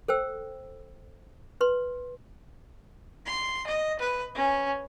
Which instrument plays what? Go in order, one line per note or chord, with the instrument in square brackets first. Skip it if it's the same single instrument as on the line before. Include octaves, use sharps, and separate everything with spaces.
[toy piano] A4 C5 G5 E6
B4 C6
[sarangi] C6
D#5
B4
C#4